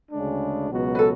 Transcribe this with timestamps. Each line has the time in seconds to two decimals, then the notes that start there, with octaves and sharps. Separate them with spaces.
0.11 D2 C#3 G#3 D4
0.70 C#2 B2 F#3 B3 F#4
0.95 B4
0.99 A4